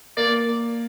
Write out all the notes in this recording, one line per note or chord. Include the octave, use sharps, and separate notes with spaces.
A#3 D5